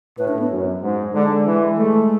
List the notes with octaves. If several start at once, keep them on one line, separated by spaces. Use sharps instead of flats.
A2 B4
D4
B3
F#2
G#2
D3 G#3
E3
G#3 A3